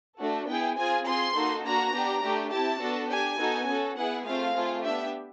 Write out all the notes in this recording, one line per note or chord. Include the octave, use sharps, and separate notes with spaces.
A3 D4 F#4 A4
B3 E4 G#4 G5
C4 F4 G#4 G#5
C4 F4 G#4 C6
A#3 D#4 F#4 A4
A#3 D4 F#4 A#5
B3 D4 G4
A3 D4 G4
C4 E4 G4 A5
B3 D4 F#4 A4
D4 G4 G#5
B3 D#4 F#4 A4
C#4 F#4 A4
B3 E4 G#4 F#5
A3 C4 F4 F5
A3 C4 F4 G#4
B3 D4 G4 E5